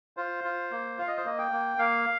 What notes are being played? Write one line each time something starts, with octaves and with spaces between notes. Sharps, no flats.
F4 C5
F4
A#3
F4 F5
D#5
C5
A#3 D#5
G5
A#3
A#3 F5